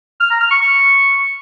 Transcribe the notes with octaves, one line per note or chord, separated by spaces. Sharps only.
F6
A#5
F6
C#6
C#6